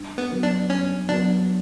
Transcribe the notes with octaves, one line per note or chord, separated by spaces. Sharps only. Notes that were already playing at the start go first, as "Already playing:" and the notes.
Already playing: G2
B3
F#3 B3
D4
G2 C#4
F#3 B3 D4